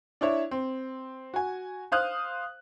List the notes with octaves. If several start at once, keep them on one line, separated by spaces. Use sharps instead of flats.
D4 E4 C#5
C4
F#4 G#5
C5 F5 D#6 F#6